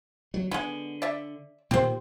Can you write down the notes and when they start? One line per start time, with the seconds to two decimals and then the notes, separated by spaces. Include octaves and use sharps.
0.34 F#3
0.51 D3 G#3 B3
1.02 D5 E5
1.71 A#2 D#3 A#3 G4 C5